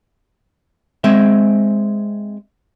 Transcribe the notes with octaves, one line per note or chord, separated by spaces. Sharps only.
G#3 C4 G#4 E5